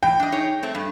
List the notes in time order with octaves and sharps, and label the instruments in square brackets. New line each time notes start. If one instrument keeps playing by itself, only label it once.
[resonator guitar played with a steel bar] E3 [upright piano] G5
[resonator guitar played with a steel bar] D4 D#5
D#4 G#4 C#5
A3 C4
G2